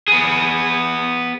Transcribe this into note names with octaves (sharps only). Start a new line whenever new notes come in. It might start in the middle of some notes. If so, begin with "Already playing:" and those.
B3 G#4